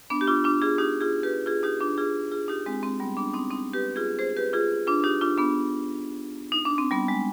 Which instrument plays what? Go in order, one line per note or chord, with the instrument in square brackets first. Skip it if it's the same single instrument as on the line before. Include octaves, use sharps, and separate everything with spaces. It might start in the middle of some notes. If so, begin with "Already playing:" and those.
[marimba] B3 D4
G4
D4 F4
D4 F4
F4 G#4
D#4 G4
F4 G#4
G4 B4
F4 G#4
D#4 G4
D4 F4
F4 G#4
F4 G#4
D#4 G4
G#3 C4
G#3 C4
G3 B3
B3 D4
C4 D#4
C4 D#4
G4 B4
F4 G#4
G#4 C5
G4 B4
F4 G#4
D4 F4
D#4 G4
D4 F4
B3 D4
D#4
D4
C4
G3 B3
G#3